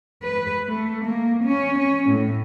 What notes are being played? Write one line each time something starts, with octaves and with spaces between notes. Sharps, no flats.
B4
A3
A#3
C#4
C#4
A2